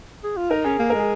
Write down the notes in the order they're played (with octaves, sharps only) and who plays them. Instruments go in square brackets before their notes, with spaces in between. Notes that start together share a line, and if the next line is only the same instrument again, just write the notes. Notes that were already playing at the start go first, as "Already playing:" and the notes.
[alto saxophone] G#4
F4
[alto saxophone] D#4 [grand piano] A#4
[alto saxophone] C#4 [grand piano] G#4
[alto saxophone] A#3 [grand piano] G#4
[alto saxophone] G#3 [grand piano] A#4
[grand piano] G#4